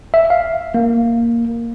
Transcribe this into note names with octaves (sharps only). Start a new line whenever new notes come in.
E5
F5
A#3